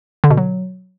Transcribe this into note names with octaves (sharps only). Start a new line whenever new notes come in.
D3
B2
F#3